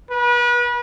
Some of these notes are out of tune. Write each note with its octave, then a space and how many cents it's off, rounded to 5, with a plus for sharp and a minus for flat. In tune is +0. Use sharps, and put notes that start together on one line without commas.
B4 -35